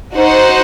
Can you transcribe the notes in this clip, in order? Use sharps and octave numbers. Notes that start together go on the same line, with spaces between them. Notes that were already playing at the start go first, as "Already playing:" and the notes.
D#4 F#4 C5 F#5